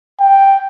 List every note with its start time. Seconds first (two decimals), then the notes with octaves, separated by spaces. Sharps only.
0.20 G5